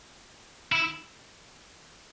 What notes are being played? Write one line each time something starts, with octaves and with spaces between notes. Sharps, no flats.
E4